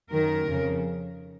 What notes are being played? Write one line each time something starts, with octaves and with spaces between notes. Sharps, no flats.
F#2 D#3 A#4
F2 C#3